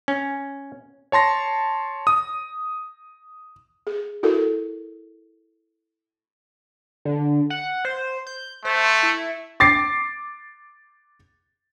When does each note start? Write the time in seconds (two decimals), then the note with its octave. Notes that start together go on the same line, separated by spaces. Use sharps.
0.08 C#4
1.12 C#5 A5 C6 A#6
2.07 D#6
3.87 G#4
4.23 E4 F#4 A4 A#4
7.05 D3
7.50 F#5
7.85 C5
8.27 G6
8.65 A3 C5
9.03 E4
9.60 D6 A6 C7